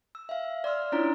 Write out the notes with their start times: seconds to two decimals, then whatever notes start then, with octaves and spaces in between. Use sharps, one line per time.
0.15 E6
0.29 E5 F5
0.64 D5 C6 E6 F6
0.92 C#4 D4 E4 F4 C#5 A#5